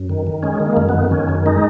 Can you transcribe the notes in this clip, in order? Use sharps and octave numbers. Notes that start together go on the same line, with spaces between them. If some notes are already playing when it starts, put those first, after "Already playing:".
Already playing: F#2
D#3
D#3
G#3 C#4
D#3
A#3
F#2
B3
D#3
D#3 C#4
F#2
G#3 D#4